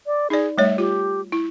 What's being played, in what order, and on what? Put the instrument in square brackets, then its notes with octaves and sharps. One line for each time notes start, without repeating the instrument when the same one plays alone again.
[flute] D5
[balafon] D#4 D5 [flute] G#4
[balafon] G3 A3 C#5 [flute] E5
[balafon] F4 [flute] G4
[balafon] E4